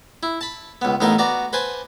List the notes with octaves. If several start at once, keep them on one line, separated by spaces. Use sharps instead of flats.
E4
A5 B5
C#2 B3
A1 A2 B3 D#4 A#4 F5
B3 F#4 D5 A#5
B4 C5 G#5 A5